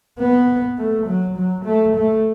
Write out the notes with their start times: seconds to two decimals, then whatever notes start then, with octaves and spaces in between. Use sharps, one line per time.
0.19 B3
0.78 A3
1.07 F#3
1.37 F#3
1.65 A3
1.96 A3